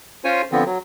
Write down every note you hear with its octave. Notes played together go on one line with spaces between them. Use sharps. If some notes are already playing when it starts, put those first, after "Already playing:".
C#4 F4 C5 C#5 G#5
D3 F3 B3 C4
F#3